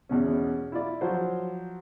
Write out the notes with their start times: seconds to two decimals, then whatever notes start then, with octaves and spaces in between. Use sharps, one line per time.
0.09 E2 B2 C#4
0.72 E4 F4 D5
1.01 F3 F#3 C5